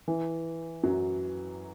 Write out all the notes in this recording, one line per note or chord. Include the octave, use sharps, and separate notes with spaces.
E3
F#2 F#3